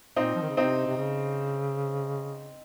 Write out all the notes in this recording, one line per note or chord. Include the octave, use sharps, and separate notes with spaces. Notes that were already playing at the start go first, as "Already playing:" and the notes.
A#2 C4 D#4
F3
D#3
C#3
C3 C4 D#4
C3
C#3